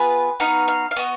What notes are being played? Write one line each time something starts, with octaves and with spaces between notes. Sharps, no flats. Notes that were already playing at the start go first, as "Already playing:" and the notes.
Already playing: B3 F4 G#4 B4
B3 D#4 F#4 F5
F5
F5
B3 F#4 D#5